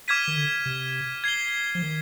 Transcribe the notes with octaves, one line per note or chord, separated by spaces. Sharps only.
D6 F6 G#6 B6 D#7
D#3
D3
C3
G#6 C7 G7
F3
D#3